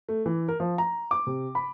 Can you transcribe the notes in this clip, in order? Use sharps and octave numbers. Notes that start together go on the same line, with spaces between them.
A3
E3
A#4
F3
A#5
D6
C3
B5